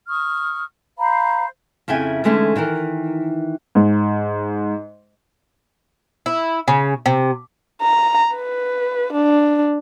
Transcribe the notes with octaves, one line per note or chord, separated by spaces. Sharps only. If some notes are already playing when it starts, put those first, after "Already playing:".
C#6 D#6 F6
C5 F5 A#5 B5
F2 C#3 E4 G5 G#5
D3 E3 G#3 A3 C#4 D#4
D#3 E3 D#4 A#4
G#2
E4
C#3
C3
A#5
B4
D4